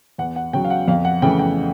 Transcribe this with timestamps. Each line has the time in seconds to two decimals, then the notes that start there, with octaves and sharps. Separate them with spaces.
0.18 E2 F#5
0.36 F#5
0.53 C#3 F#3 G5
0.65 F5
0.70 F#5
0.88 F2 F5
1.05 F#5
1.22 C#3 E3 A3 G5
1.39 G5